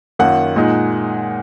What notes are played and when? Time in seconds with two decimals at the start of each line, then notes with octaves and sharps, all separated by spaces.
0.19 F#2 D#3 A#3 F4 F#5
0.56 A#2 G#3 D#4